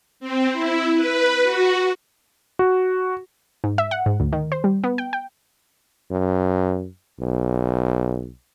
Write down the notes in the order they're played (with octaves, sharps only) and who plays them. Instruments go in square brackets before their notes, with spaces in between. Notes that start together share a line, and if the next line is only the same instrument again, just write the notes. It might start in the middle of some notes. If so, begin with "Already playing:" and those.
[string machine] C4
E4
B4
F#4
[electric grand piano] F#4
[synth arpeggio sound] G#2
E5
F#5
G#2
D2
D#3
C5
G3
B3
G5
G5
[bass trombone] F#2
B1